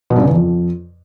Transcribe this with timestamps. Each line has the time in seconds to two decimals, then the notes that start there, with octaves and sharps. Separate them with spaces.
0.10 B2
0.16 G2
0.22 C#3
0.27 E2
0.33 F2